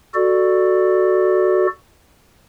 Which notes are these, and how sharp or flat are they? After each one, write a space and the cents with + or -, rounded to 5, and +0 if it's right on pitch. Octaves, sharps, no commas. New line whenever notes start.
F#4 +0 A4 +0 D5 +15